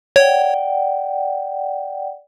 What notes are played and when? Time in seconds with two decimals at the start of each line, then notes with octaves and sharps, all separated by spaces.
0.16 C#5 D5 F#5 G5